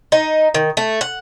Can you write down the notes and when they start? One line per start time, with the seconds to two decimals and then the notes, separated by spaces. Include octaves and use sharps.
0.12 D#4
0.54 D#3
0.77 A3
1.01 F#5